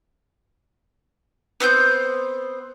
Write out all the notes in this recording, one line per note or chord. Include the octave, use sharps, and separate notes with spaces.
B3 C4 C5 G6